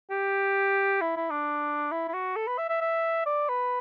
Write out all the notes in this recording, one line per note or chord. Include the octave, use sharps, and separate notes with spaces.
G4
E4
E4
D4
E4
E4
F#4
A4
B4
E5
E5
E5
D5
B4